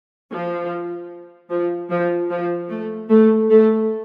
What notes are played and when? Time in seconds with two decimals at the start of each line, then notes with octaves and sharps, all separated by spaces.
0.32 F3
1.50 F3
1.90 F3
2.30 F3
2.69 A3
3.09 A3
3.49 A3